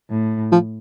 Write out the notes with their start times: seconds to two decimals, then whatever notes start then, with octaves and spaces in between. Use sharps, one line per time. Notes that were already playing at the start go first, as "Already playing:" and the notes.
0.10 A2
0.52 F3